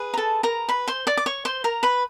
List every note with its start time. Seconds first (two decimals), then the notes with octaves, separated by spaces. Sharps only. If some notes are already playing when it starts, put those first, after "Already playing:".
Already playing: G#4 B4
0.14 A#5
0.17 A4 A5
0.43 A#4 A#5
0.69 B4 B5
0.88 C5 C6
1.07 D5 D6
1.17 D6
1.26 C#5 C#6
1.45 C5 C6
1.64 A#4 A#5
1.83 B4 B5